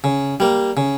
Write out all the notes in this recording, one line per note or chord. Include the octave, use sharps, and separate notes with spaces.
C#3
G3 A#3
C#3